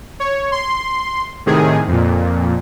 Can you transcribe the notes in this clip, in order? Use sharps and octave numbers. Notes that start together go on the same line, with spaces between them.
C#5
C6
A2 C3 D#3 G#4
F2 A#2